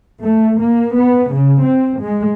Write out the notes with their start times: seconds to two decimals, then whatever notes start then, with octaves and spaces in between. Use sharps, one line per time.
0.23 A3
0.59 A#3
0.97 B3
1.33 C#3
1.64 C4
2.01 G#3